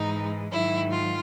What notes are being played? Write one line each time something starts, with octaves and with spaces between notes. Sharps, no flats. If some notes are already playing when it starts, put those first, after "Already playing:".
Already playing: G#2 E3 G#3 D#4
G#2 D#3 F#3 E4
F4